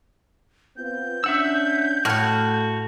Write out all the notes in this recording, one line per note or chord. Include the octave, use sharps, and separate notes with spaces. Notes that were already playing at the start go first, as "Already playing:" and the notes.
B3 C4 F4 G6
C#4 D4 E5 F#5 E6
A2 A3 F#4 F#5 F6